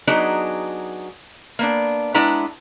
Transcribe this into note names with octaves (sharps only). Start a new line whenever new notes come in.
F#3 B3 D4 D#4 F#4 G#4
A#3 B3 D4
G#3 B3 D4 E4 B4 A#5